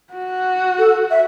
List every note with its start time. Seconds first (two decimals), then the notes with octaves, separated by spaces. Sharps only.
0.13 F#4
0.79 A4
1.11 E5